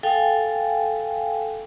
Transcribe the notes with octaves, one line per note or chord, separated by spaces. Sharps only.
A4 F5 G5 G#5